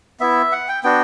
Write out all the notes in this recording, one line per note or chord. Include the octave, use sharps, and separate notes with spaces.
B3 E4 E5
F#5
G5
B3 D4 F#4 G5